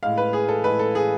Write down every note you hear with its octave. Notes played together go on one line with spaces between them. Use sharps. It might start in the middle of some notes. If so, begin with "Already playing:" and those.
A2 G#3 F5
B4
G#4
A4
A2 G#3 B4
A4
G#4